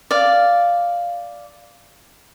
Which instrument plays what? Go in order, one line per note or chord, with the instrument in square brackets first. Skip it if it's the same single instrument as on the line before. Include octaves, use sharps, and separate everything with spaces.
[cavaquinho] D5 F5